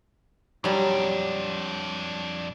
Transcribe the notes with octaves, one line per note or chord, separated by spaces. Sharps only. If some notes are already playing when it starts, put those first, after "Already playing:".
F2 F#3 G3 D4 A#5